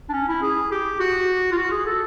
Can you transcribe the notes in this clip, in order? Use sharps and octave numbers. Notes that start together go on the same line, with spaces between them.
D4
C#4
E4
G#4
G4
F#4
F4
F#4
G#4
A4